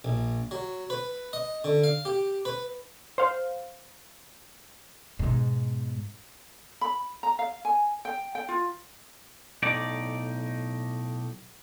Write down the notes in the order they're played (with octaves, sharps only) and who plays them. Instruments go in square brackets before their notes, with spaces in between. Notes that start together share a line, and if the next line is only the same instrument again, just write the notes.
[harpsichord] A#1
F#3
B4
D#5
D3
F5
G4
B4
[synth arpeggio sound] C5 F5
[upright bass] G#2 B2
[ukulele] B5
A#5
F5
G#5
G5
G5
F4
[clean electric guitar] B1 A2 D#4 D5